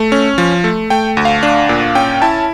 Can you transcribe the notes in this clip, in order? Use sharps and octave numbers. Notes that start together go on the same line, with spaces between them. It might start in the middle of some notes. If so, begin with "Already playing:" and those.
Already playing: A3
C#4
F3
A3
A3 G5
D2
F5
D4
A#2
C#4 G5
E4 A5